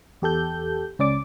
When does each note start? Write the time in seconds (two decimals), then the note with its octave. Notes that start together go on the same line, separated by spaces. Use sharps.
0.22 E2 G4 A4 G6
0.99 C#2 C#4 D5 D6